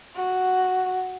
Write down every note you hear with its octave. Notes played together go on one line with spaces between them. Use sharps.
F#4